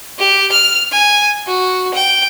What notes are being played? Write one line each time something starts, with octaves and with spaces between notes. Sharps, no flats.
G4
F6
G#5
F#4
G5